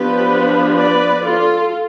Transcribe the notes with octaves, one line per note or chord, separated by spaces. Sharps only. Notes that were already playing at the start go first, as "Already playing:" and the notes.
Already playing: F3 B3 D4 G4 B4
B4 D5
F4 A4